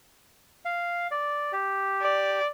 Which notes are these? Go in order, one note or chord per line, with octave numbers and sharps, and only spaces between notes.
F5
D5
G4
D5